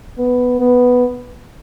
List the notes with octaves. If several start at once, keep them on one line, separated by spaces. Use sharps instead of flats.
B3
B3